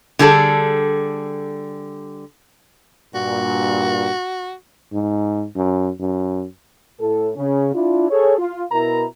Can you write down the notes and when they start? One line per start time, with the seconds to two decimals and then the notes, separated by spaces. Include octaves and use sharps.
0.19 D3 G3 G#4 A4
3.15 G2 A#2 F#4
4.93 G#2
5.56 F#2
6.00 F#2
7.00 A2 A4
7.36 C#3 C#4
7.74 D4 E4 F4
8.10 G#4 A4 C#5
8.38 F4
8.72 B2 E4 A#4 A#5